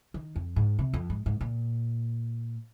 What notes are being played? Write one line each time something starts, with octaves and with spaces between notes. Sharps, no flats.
D#3
F2
G#2
C3
F2
G#2
G#2
A#2